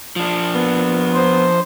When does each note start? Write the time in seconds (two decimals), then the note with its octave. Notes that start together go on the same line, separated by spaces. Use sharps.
0.16 F3 D4
0.55 B3
1.14 C5